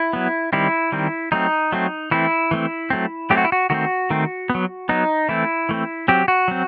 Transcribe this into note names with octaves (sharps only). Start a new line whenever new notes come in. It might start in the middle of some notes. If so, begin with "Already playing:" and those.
Already playing: E4
F#3 B3
D#3 G3 C4 E4
D#3 G3 C4
F#3 A3 C4 D#4
F#3 A3 C4
E3 A3 C4 E4
E3 A3 C4
F#3 A3 C4
F#3 A3 C4 G4
F#4
E4
F#4
D#3 A3 C4 F#4
D#3 A3 C4
B3
F#3
F#3 B3 D#4
E3 A3 C4 E4
E3 A3 C4
F#3 C4 G4
F#4
F#3 C4